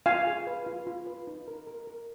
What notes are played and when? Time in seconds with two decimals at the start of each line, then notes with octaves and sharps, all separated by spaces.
0.06 F4 F5 G#5
0.27 G#4
0.47 B4
0.66 F4
0.87 F4
1.07 B4
1.27 D#4
1.48 A#4
1.67 A#4
1.87 A#4